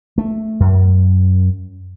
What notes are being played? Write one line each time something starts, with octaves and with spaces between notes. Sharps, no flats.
A3
F#2